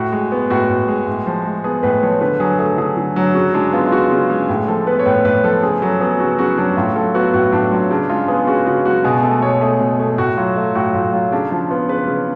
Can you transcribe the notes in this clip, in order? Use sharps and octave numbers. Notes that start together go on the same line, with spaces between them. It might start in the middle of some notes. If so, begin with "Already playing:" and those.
Already playing: A2 F#4
G#3
B3
A2 F#4
A2
G#3
A2
F3
G#3
B3 G#4
A2 B4
F3 C#5
D3 B4
F#3 G#4
A3 G#4
D3 G#4
D3
F#3
C#3 F#4
G#3 D4
B3 F4
F4
C#3 F#4
C#3
G#3
A2
F3 A4
B3 B4
C#5
A2 B4
A2 B4
F3 A4
C#3 G#4
F#3 A4
B3 G#4
C#3 F#4
C#3 F#4
F#3 D4
A2 F4
F#3 A4
B3 F#4
A2 F#4
A2 D4
F#3 F4
C#3 D4
G#3 F4
B3 G#4
C#3 F#4
C#3 F#4
G#3 F#4
B2 G#4
A3 A4
B2 C#5
A3 G#4
B2
A3
A2 F#4
F#3 F4
A3
A2 F#4
A2 F4
F#3 F4
C#3 D4
F3 F4
B3 F4
C#3 B4
C#3